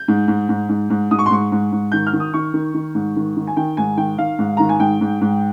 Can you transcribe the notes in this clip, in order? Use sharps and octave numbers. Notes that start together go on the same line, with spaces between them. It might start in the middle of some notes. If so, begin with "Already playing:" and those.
Already playing: G6
G#2
G#2
G#2
G#2
G#2
G#2 D#6
C#6
C6
G#2 C#6
G#2
G#2
D#3 G6
F6
D#3
D#6
D#3 C#6
D#3
D#3
G#2
D#3
D#3
G#5
D#3 G5
G#2 G#5
D#3 G5
D#3 F5
G#2
D#3 A#5
G#5
G#2 G5
G#2
G#2